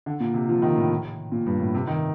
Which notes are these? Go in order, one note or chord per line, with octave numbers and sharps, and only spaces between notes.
D3
A#2
C3
F3
D#3
A2
A#2
G2
A2
C3
D#3